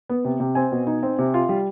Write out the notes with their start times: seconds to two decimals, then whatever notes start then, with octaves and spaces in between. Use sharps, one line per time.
0.09 B3
0.25 C3
0.40 C3
0.55 C4 G#5
0.72 B2
0.87 D#4
1.03 C4
1.19 C3
1.34 F4
1.49 G3